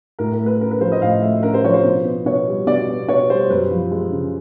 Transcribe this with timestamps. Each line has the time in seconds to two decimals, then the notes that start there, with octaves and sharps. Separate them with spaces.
0.19 A2 A#4
0.33 A#4
0.39 A3
0.46 B4
0.61 C#4 A#4
0.71 B4
0.81 F3 C5
0.92 D#5
1.02 A2 F5
1.22 A3 E5
1.43 C#4 A#4
1.54 C5
1.65 F3 C#5
1.74 C5
1.85 B2
2.05 B3
2.26 B2 C#5
2.47 G3
2.67 B2 D5
2.88 B3
3.08 B2 C#5
3.30 G3 C5
3.50 F#2 B4
3.71 F3
3.91 G#3
4.12 C#3